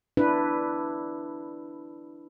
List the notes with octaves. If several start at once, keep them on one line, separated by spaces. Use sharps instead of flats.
D4 E4 B4